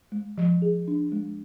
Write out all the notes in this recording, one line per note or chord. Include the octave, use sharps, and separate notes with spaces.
G#3
F3
G#4
D4
G#3